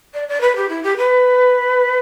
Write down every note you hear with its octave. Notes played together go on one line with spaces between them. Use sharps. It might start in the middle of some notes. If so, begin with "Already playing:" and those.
D5
D5
B4
G4
E4
G4
B4